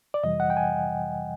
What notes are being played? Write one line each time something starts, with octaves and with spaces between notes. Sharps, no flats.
D5
F2 C3 E3 G3 D#5
F#5
G5
G#5